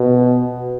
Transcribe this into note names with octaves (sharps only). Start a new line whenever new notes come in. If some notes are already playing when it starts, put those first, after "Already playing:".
Already playing: B2